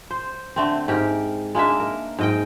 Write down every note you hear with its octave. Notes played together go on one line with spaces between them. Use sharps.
C5
D3 A3 C4
G#2 G4 A#4
G#3 A#3 D4 E5
A#4
G#2 D#5 G5